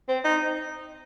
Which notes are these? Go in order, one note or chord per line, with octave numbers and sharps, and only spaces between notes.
C4
D#4